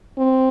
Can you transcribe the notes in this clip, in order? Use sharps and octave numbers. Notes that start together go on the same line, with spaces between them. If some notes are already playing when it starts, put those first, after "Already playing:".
C4